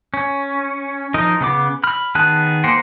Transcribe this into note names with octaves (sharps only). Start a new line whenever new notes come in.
C#4
F3 D#4 A#4 D#5
C#3 B3 D6
B5 F6
D#3 B3 G#4 A5 F#6
A#3 A#4 C5 F#5 G5